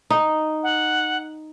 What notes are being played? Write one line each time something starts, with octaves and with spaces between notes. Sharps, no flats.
D#4
F#5